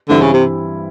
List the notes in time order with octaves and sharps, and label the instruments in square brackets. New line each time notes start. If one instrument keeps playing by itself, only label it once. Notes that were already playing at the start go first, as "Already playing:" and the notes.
[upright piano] G2 E3 G3 C4 E4 [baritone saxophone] D3
[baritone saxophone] C#3
C3